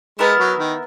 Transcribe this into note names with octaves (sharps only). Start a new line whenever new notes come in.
G#3 B3 E4 A#4
F#3
D#3